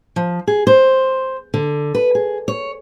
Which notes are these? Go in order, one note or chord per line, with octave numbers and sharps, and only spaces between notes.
F3
G#4
C5
D3
B4
G#4
C#5